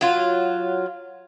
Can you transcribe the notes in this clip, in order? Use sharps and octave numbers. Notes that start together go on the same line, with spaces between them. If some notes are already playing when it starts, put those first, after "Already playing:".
F#3 F4